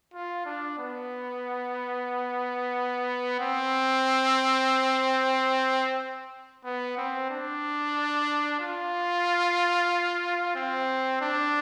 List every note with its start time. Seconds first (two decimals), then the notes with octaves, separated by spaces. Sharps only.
0.14 F4
0.46 D4
0.78 B3
3.40 C4
6.64 B3
6.97 C4
7.30 D4
8.60 F4
10.55 C4
11.21 D4